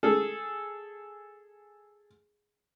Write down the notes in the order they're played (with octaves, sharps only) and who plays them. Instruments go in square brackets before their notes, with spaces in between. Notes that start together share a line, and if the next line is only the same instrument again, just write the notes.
[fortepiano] G#4 A4